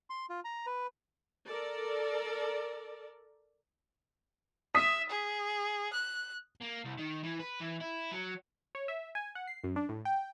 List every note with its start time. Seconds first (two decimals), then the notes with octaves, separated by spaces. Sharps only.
0.10 C6
0.30 F4
0.45 A#5
0.66 B4
1.47 A4 A#4 D5
4.75 E5 D#6 B6
5.09 G#4
5.93 F#6
6.62 A#3
6.85 C2
6.98 D#3
7.23 E3
7.39 B4
7.60 E3
7.80 E4
8.11 F#3
8.75 C#5
8.88 E5
9.15 G#5
9.35 F#5
9.48 C7
9.64 F#2
9.76 D4
9.89 A2
10.05 G5